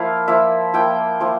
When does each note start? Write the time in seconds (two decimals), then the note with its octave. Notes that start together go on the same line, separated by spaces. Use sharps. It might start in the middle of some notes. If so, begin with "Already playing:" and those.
Already playing: F3 A#3 E4 F5
0.28 F3 A#3 E4 E5
0.74 F3 A#3 E4 G5
1.20 F3 A#3 E4